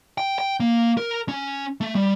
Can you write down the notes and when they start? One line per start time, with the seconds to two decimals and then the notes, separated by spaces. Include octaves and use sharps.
0.18 G5
0.39 G5
0.60 A#3
0.97 A#4
1.29 C#4
1.81 A3
1.95 G3